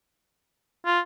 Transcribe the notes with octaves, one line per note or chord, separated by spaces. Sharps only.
F4